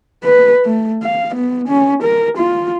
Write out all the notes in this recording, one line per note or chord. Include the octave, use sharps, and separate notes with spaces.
B4
A3
F5
B3
C#4
A#4
F4